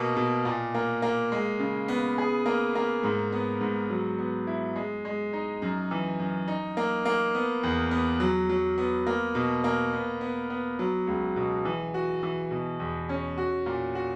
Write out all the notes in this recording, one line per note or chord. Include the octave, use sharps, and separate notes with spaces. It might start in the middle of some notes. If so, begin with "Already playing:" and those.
Already playing: B2 A#3 B3
B2
A#2
A#3
A#3
G#3
C#3
B3
G#4
A#3
A#3
G#2
B3
G#2
F#3
B3
E4
G#3
G#3
D#4
F#2
E3
F#2
D#4
A#3
A#3
B3
E2
B3
F#3
F#3
B3
A#3
B2
A#3
B3
B3
B3
F#3
C#2
B2
E3
F#4
E3
B2
E2
C#4
F#4
A#2
F#4